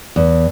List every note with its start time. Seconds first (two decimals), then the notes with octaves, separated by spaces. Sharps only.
0.16 E2